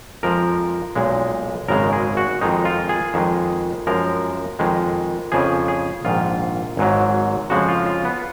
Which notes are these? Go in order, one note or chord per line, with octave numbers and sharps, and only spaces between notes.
F2 F3 G#3 A#4
B1 A#2 G#3
G#1 F#2 C#3 G#3 A#4
G#4
F#4
F2 D#3 G#3 D#4
F4
G#4
F2 D#3 G#3
F#2 F3 G#3 A#4
F2 D#3 G#3
F2 C#3 F3 G#4
G#4
A#1 G#2 D#3 F4
G#1 G#2 F#3
F2 C#3 F3 G#3 F#4
F4
F4
B3